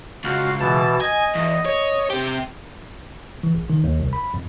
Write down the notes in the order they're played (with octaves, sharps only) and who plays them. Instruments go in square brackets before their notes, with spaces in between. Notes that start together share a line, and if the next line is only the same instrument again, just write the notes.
[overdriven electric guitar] C#2 [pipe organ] F#4 F5
[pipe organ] B2 E3 A5
[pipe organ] D#5 [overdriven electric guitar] G#5
[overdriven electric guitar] E2
C#5
C3 G4
[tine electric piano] E3
A#1
D#3
D#2
C2
B5
F2